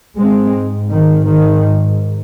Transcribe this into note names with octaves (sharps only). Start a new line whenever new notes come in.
G#2 G#3 C4
D#3
D#3